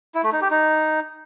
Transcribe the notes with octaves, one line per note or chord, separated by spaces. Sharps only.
E4
A3
D#4
G4
D#4